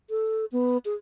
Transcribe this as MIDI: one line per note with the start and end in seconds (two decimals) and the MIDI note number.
0.10 0.45 69
0.52 0.78 59
0.85 0.94 68